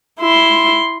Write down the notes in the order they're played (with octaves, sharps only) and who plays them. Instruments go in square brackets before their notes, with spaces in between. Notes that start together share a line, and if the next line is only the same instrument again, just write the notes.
[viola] E4 C6